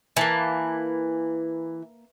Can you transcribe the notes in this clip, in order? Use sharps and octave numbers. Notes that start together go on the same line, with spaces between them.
E3 A#3 A5